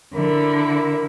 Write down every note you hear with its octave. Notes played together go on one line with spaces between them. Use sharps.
D3 E4 A#4